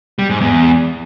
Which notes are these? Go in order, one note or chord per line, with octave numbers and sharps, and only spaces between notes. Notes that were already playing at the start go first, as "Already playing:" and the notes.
G3
G#2
E2